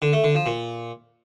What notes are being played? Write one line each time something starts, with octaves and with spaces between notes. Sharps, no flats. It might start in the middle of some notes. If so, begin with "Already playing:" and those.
D3
A3
D3
F3
A#2